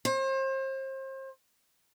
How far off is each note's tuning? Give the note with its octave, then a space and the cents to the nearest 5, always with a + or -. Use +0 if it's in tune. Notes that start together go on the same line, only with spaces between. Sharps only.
C5 +35